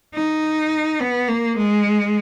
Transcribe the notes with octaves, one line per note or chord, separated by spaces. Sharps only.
D#4
B3
A#3
G#3